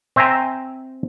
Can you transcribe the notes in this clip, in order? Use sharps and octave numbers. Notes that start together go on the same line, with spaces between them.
C4 E5 G5 G#5 A#5